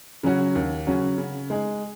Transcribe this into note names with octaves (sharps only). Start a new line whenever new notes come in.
C#3 F#3 C#4 F#4
D#2
C#3 F#3 C#4 F#4
C#3
G#3 D#4 G#4